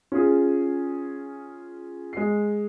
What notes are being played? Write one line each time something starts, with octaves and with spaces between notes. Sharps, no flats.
C#4 F4 G#4
G#3 C7